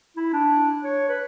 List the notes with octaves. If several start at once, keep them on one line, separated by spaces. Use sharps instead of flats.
E4
D4
C#5
B4